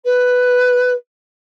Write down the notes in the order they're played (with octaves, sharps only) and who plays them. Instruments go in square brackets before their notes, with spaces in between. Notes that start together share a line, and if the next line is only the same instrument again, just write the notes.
[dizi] B4